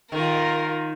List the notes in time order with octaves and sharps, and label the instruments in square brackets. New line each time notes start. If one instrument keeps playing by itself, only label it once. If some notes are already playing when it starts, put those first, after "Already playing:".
[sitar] D#3 [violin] F4 A#4